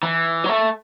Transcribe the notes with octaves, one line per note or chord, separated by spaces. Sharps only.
E3
F#3
A3